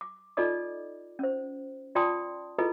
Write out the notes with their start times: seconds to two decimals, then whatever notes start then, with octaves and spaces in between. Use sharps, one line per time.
0.01 D6
0.37 D#4 F4 A4 D5 D#5 D6
1.19 C#4 C5
1.95 F4 D5 G5 A5 C6 D#6
2.58 E4 F4 G#4 A4 B4 D#5